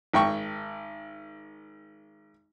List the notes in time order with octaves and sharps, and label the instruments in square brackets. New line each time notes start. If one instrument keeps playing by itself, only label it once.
[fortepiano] G#1 G5 C#6